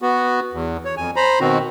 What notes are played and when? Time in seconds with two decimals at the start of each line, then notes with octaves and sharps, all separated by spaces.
0.02 B3 F#4
0.53 E2
0.85 C#5
0.97 F2 G#5
1.16 C5 A#5 B5
1.40 B2 D#3 C4 F#4